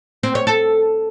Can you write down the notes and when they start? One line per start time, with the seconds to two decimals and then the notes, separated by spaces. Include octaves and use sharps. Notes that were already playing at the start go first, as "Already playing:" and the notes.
0.23 C4
0.35 C#5
0.47 A4